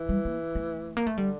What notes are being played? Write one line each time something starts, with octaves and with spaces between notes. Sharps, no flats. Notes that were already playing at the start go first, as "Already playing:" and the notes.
Already playing: E3
G3
A#3
A3
A#3
A3
D3 G3